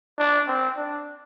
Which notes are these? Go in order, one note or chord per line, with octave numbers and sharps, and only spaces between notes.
D4
C4
D4